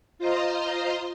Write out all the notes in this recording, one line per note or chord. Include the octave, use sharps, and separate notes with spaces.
F4 C5 D#5 A#5 C6